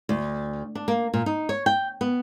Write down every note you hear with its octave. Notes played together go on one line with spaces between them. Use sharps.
D2
D4
A#3
A#2
D#4
C#5
G5
B3